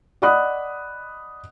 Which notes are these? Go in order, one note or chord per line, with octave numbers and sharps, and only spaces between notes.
D5 D#5 F#5 B5 D#6 F#6